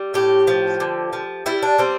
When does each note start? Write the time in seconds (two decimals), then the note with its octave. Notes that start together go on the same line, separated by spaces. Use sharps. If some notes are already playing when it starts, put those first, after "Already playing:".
Already playing: G3
0.14 A2 G4
0.47 F3
0.80 D3
1.13 F3
1.46 G3 E4
1.62 D4
1.78 G3 C4